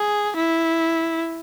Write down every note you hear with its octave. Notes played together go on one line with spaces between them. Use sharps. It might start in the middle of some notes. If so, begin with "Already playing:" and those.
Already playing: G#4
E4